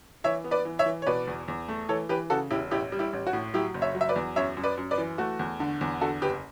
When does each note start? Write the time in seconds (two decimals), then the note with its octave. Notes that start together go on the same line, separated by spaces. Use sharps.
0.24 E3 C#5 E5
0.44 B3
0.51 B4 D5
0.65 E3
0.79 C#5 E5
0.86 E3
1.02 C#5
1.07 B2 B4 D5
1.27 E2
1.48 E2
1.68 A3
1.89 E3 A4 C#5
2.09 E3 G4 B4
2.30 C#3 F#4 A4
2.51 E1 E4 G4
2.71 A1 E4 G4
2.92 G3
2.99 E4 G4
3.13 A1
3.27 F#4
3.33 A2
3.54 F#3 E4 G4
3.74 F#1
3.82 C#5 E5
3.95 F#3
4.01 E5
4.09 B4 D5
4.16 E2
4.36 F#2 C#5 E5
4.57 F#2
4.63 B4 D5
4.77 F#2
4.91 B4 D5
4.98 E3
5.18 A3 F#4
5.39 E2
5.60 D3
5.81 E2
6.01 D3 F#4 A4
6.22 F#1 G4 B4